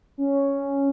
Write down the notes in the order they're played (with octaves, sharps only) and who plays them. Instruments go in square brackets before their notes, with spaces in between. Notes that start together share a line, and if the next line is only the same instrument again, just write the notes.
[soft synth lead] C#4